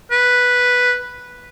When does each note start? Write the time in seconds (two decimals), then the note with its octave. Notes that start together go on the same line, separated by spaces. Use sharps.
0.11 B4